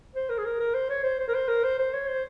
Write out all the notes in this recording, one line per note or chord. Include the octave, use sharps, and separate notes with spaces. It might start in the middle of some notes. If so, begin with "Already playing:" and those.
C5
A#4
G#4
A#4
A#4
C5
C#5
C5
C5
A#4
C5
A#4
C5
C5
C#5
C5